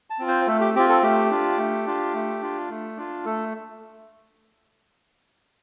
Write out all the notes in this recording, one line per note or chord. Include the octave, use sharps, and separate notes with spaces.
A5
C4 F4
C5
A3 A4
G4
C4 F4 G4
A4
A3 G4
D4 F4
A3
D4 F4
A3
D4 F4
A3
D4 F4
A3 A4